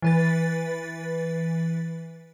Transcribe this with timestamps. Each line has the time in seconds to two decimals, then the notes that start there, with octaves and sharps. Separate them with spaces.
0.02 E3 B4 A6